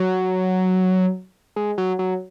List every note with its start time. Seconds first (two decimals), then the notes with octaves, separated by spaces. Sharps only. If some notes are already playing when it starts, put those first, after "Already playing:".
Already playing: F#3
1.56 G#3
1.78 F#3
1.99 F#3